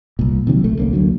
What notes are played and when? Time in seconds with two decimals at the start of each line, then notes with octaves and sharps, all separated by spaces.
0.19 C2 A#2
0.47 C3 D#3 F3 F#3
0.64 A#1 A3
0.77 C2 A#3 C#4
0.93 D2 D3 F#3